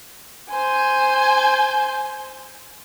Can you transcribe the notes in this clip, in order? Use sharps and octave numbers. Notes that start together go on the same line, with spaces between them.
C5 G#5